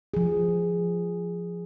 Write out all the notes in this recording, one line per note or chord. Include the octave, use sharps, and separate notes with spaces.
F3 G#4